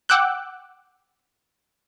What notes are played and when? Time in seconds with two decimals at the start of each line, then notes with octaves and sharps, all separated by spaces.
0.09 F#5 G5 D6 E6 F#6 G6